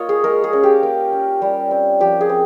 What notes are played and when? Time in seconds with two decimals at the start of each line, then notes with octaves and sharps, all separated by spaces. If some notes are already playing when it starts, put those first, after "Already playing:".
Already playing: A#3 F4 C#5 D#5
0.09 G#4
0.24 G#3 A#4
0.44 G#4
0.53 C#4
0.63 G4
0.83 A#3
1.13 C#4
1.42 G3
1.71 C4
2.00 F3 G4
2.21 G#4
2.29 C4